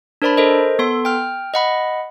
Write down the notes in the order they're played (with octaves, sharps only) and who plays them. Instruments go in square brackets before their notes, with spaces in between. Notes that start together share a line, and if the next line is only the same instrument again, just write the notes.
[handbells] D4 A#4 C5 D5 A5 B5
A4 A#4 C5 D#5
B3 A4 C6
G5 F6
D#5 F#5 B5